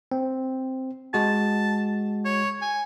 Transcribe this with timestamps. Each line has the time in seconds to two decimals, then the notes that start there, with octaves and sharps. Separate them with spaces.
0.12 C4
1.14 G#3 F#4 A5
2.25 C#5
2.62 G#5